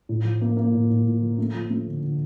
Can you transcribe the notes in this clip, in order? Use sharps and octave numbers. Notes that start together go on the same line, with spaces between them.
A2
F3
A#3
A#3
A2
A2
A2
F3
A3
F3
A3
D3
D3